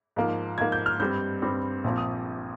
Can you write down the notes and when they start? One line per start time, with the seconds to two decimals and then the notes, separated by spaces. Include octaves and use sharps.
0.16 G#2 F3 A#3
0.58 G#2 F3 A#3 G#6
0.72 G6
0.86 F6
1.00 G2 G3 C4 G6
1.42 G2 G3 C4
1.84 A#1 A#2 F3 C4
1.98 D#6